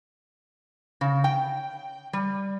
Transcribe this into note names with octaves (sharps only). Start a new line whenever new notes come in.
C#3
G5
G3